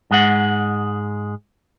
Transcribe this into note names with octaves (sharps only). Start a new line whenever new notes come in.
G#2 G#3 F#5